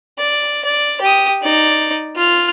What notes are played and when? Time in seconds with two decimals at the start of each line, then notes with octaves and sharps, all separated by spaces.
0.19 D5
0.65 D5
1.01 G4 D#6
1.42 D#4 D5
2.16 F4 F6